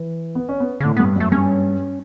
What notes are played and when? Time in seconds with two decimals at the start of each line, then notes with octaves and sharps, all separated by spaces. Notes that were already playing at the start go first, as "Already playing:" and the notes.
Already playing: E3
0.35 B3
0.49 C#4
0.60 B3
0.80 C#3
0.84 A2 D3
0.97 G2 B3
1.16 F#2 A3
1.32 G2 C#4